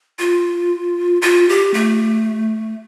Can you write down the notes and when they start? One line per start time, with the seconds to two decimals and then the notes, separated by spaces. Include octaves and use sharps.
0.19 F4
1.22 F4
1.49 G4
1.74 A3